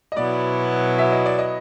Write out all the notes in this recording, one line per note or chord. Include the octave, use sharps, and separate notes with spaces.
D#5
B2 F#3 B3 E4 D5
E5
D#5
D5
D#5